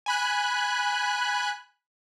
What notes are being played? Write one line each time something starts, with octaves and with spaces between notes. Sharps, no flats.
G#5 B5 F#6